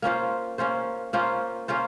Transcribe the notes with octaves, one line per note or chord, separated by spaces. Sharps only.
A#3 C#4 F4 C5
A#3 C#4 F4 C5
A#3 C#4 F4 C5
A#3 C#4 F4 C5